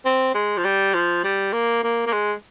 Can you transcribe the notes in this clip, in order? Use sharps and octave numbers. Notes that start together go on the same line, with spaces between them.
C4
G#3
F3
G3
F3
G3
A#3
A#3
A#3
G#3